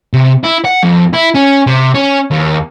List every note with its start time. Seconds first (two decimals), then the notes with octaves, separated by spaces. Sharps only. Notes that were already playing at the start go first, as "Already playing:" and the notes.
0.13 C3
0.43 E4
0.65 F#5
0.83 F2
1.14 E4
1.35 C#4
1.67 C3
1.94 C#4
2.31 D#2